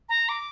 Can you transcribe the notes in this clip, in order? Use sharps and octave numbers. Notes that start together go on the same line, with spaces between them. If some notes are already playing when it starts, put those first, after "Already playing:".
A#5
D6